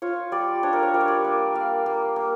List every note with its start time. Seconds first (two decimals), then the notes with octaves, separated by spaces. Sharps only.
0.02 F4 C#5
0.32 G3 D5
0.63 D4 C#5
0.73 A#4
0.83 C#5
0.94 G3 D5
1.01 C#5
1.08 D5
1.24 A#3 E5
1.54 A#3 F5
1.86 A#3
2.16 A#3